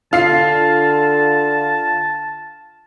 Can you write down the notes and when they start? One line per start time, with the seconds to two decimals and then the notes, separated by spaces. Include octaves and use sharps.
0.13 D3 F4 A5 C7